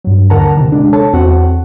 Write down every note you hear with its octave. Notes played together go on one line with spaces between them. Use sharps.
G2 F#3
D#2 D3 A#4 F#5 A5 A#5
C3 D#3
G#3 D4
A4 C#5 A5
E2 C4 F#4 F#5